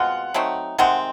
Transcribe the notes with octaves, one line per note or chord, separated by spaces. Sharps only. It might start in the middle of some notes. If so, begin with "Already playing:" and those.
Already playing: B2 G#3 C4 F4 F#5
F#3 A3 C4 D#4
C3 D#3 G#3 C4 F#5